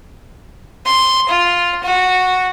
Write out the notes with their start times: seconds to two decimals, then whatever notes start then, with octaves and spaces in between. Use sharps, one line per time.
0.86 C6
1.29 F4
1.83 F#4